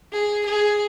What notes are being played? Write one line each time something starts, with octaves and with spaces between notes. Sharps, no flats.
G#4
G#4